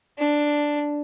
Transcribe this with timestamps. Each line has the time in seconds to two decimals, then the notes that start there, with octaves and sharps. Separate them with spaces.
0.18 D4